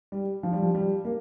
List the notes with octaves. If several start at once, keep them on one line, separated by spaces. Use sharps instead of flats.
G3
F3
G3
F3
G3
A#3